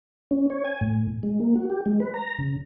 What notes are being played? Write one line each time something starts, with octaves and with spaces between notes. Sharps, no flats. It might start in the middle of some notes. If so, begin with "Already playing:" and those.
C#4
C#5
G#5
A2
G#3
A#3
F#4
G4
G#3
B4
A#5
C#3